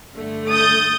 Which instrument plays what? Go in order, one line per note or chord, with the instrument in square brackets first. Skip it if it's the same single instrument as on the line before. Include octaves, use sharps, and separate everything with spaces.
[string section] G2 D3 A3
[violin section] D#6 G6 A6